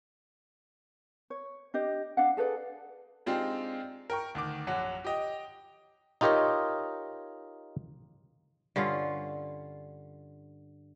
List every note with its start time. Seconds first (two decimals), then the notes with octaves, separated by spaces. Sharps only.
1.30 C#5
1.74 D4 G4 D#5
2.17 D4 F5 F#5
2.37 G#4 A4 B4 D5
3.26 G#3 C4 D4 D#4 F4 G4
4.10 A#4 G5 C#6
4.35 D2 D#3 D6
4.67 A#1 F#2 F#3 F#5
5.04 G4 D#5 G5
6.21 D#4 F4 G4 A#4 C#5 D#5
8.76 G2 D3 C#4 F4